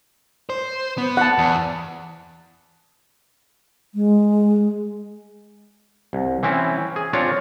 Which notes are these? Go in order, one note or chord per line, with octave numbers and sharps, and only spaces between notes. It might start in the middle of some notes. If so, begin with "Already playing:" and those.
C5
B3
F#5 A5
E2
G#3
C2
E3 C4 C#4 E4
G#4
C4 D4 F4 C#5